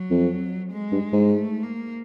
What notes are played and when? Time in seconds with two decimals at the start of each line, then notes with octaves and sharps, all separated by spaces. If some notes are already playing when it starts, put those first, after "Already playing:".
Already playing: F#3
0.10 F2
0.72 G#3
0.92 G2
1.13 G#2
1.33 A3
1.63 A#3